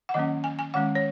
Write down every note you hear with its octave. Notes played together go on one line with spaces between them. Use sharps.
F#5
D#3 F#3 A#3 C#4 D#5
G#5
G#5
D#3 G#3 C#4 F#5
C#5